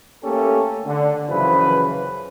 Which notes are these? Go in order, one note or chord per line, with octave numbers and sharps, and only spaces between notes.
A3 A#3 C#4 G4 A4
D3
F#2 C#3 E3 F3 B4 C5